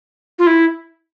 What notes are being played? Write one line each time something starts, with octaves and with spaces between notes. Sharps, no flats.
F4
E4